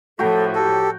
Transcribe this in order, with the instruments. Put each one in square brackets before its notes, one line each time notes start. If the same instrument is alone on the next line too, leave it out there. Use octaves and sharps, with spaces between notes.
[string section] A2 F3 [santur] F#4 G5 A#5 [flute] A4
[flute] G4 [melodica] A4